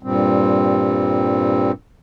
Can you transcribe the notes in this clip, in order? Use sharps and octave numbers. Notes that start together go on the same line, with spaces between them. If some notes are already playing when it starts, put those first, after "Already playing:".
G2 A#2 G3 C4